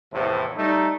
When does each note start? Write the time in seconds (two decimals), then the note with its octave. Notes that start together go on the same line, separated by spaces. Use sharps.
0.13 E2 A2 C3 F3
0.56 G3 A3 D#4